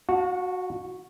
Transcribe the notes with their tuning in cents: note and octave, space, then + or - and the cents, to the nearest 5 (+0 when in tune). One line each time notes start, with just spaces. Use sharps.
F#4 -10 F5 +45 A5 +0